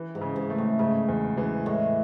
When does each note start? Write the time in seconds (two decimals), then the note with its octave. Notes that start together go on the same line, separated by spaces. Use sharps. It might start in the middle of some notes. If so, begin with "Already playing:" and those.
Already playing: E3
0.15 G#2
0.21 C#3
0.36 G#2
0.50 A3
0.58 A2
0.79 G#2 C#3
1.08 E2
1.37 E3
1.66 A2 G#3